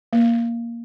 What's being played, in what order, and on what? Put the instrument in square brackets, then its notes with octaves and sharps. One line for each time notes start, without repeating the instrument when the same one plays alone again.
[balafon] A#3